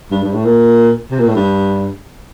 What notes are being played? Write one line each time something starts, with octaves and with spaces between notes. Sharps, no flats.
G2
G2
A2
A#2
C3
A#2
A2
G2